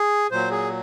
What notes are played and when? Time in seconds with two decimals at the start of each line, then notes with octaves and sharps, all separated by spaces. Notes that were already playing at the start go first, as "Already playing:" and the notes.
Already playing: G#4
0.31 A#2 F#3 C5
0.51 G#4